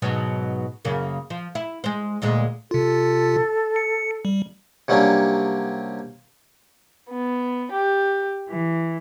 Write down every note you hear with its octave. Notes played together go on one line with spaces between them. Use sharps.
G#2 B2 F#3
F#2 C#3 A#3
F3
E4
G#3 C5
D2 A#2 G#3
C3 F4 A4
C#7
G3
C3 F#3 G3 A#3 C#4 D4
B3
G4
E3